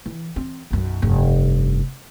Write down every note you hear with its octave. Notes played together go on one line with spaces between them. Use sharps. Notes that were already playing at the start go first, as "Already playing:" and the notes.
E3
C4
B1 F#2
F1 G2